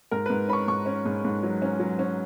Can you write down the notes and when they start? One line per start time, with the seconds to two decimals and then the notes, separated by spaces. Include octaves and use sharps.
0.11 G#2 A#4
0.26 G#2 B4
0.48 C#4 B5
0.53 C#6
0.68 G#2 C#6
0.86 C#4
1.06 G#2
1.25 G#2
1.43 F#3
1.62 C#4
1.80 F#3
1.99 C#4